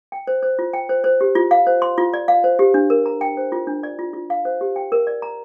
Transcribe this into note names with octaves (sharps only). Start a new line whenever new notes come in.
G5
C5
C5
F4
G5
C5
C5
G4
F4
F5
C5
C6
F4
D5
F5
C5
G4
D4
A#4
A#5
G5
C5
F4
D4
D5
F4
F4
F5
C5
G4
G5
A#4
D5
A#5